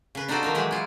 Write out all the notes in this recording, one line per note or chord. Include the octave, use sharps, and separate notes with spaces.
C#3 B4
D4 D#4 F4 F#4 A4 D5
D#3 F3 D#4
E3 F#3 G#3 G4
E4 F4